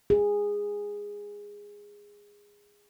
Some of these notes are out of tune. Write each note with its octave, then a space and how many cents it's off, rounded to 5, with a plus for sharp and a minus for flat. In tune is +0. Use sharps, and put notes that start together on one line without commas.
G#4 -15